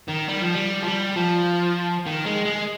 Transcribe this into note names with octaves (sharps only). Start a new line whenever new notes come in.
D#3
G3
F3
G3
F3
G3
F3
D#3
G#3
G#3